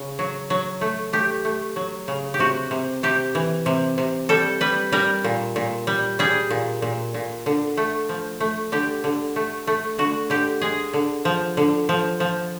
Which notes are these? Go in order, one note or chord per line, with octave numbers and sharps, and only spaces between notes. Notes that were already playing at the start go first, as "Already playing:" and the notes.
Already playing: C#3
F#3
F#3
A3
A3 G4
A3
F#3
C#3
G4
C3 F#4
C3
C3 G4
E3
C3
C3
G3 A4
G3 B4
G3 A#4
A#2
A#2
G3
G3 G#4
A#2
A#2
A#2
D3
A3
F3
A3
D3 G4
D3
A3
A3
D3 F#4
D3 G4
G#3 G#4
D3
F3
D3
F3
F3